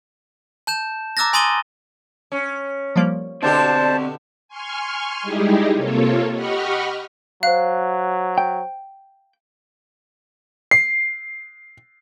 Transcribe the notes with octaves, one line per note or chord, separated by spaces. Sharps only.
A5 G6 E7
A#5 D6 E6 F#6 A6 A#6
G#5 C6 D#6 A6 D#7 G7
C#4
F3 G3 A#3
B2 D3 C4 G4 C5 D5 A5
G#5 C6 C#6 F6
G3 G#3 D#4 E4 G4 G#4
C3 A#3 F4 A4 C#5
G4 D#5 F#5 B5 C#6 F6
F#3 C5 F5 F#6
G5
C7